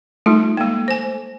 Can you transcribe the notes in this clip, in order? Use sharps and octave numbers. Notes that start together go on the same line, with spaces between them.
G3 A3 D#4 F4
G#3 A#3
C5 G#5